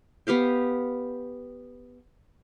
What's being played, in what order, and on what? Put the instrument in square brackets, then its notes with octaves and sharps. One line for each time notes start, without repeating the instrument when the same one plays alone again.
[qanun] B3 G4 F5 G5